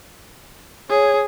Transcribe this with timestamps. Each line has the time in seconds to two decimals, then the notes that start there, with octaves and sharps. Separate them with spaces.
0.90 G#4 C#5